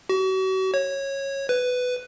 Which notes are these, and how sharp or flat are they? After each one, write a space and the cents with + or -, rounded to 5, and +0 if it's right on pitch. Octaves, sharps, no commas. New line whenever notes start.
F#4 +40
C#5 -15
B4 +10